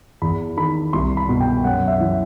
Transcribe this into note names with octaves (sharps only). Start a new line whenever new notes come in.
E2 B5
D#3 B5
C2 C6
B5
B2
G5
F#2 F#5
E5
E3